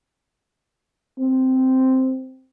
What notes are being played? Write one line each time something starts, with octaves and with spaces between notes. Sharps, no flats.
C4